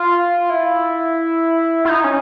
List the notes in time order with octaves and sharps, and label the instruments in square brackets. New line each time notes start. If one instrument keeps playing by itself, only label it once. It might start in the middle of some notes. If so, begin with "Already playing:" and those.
Already playing: [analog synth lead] F4
E4
E4
D#4
C#4